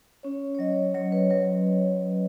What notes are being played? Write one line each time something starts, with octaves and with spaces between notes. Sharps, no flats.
C#4 C#5
C#5
F#3 D#5
F#3 C#5
B4
F#3 B4